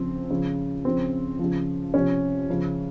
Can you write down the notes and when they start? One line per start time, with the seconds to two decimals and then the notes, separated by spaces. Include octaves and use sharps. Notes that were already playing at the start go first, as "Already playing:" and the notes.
Already playing: C#3 F3 C4
0.31 C#3 F3
0.85 C#3 F3 C4
1.39 C#3 F3
1.94 C3 F3 C#4
2.49 C#3 F3